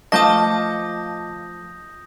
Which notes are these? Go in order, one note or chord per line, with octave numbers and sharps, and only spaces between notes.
F3 A3 D#5 F5 D6 D#6 G6 A#6